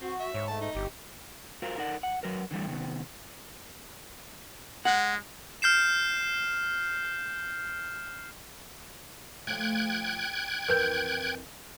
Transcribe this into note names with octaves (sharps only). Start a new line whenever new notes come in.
C4 F#4
E5
G#2 C#5
A3 A5
D#4
G1 G4
F4 F#4 A#4 C5 F5
D#4 A4 A#4 D5 F#5
F#5
F#3 F#4 A#4 B4
D3 E3 G3 A3
C3 D#3 B3
G#3 F#5
F6 G6 C7 E7
F3 A3 G5 F#6 G#6
F2 E3 A#4 B4 G6